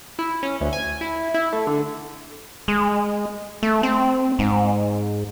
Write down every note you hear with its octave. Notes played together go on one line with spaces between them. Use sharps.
E4
C#4
D2
G#5
E4
E4
A3
D3
G#3
A3
C4
G#2